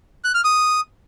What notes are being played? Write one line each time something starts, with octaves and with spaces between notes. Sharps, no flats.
F#6
F6
D#6